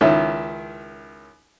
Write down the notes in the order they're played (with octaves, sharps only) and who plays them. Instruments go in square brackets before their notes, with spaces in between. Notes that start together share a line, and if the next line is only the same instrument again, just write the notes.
[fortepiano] C#2 D#3 C#4 E4 E5